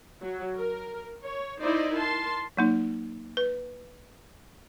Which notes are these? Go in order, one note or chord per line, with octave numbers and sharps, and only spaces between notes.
F#3
A#4
C#5
D#4 E4 C5 D5 D#5
A#4 A5 C6
F#3 A#3 D#4
B4